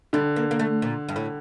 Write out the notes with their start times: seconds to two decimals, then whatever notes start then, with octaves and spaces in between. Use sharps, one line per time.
0.13 D3 G3
0.36 A#3
0.51 A#3
0.59 A3
0.82 A#2
1.09 G2
1.16 A2